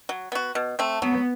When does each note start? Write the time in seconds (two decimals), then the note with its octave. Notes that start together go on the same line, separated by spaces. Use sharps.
0.09 F#3
0.32 B3 F#4
0.55 B2
0.79 A3 C4
1.02 F#3 B3